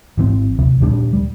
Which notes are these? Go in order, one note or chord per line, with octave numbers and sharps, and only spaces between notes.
G#1 E3 C4
D#2 C3
D#2 A#2 G3 D4
G3